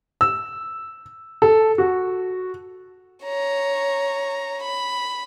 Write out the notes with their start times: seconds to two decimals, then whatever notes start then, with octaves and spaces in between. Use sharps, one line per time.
0.21 E6
1.42 A4
1.78 F#4
3.24 C#5 A#5
4.63 B5